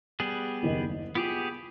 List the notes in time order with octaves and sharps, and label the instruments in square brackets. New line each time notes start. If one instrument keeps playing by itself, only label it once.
[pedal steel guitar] G3 B3 G#4
[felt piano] F#1 D#2 D#5
[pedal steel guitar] B3 G4 G#4 [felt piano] F4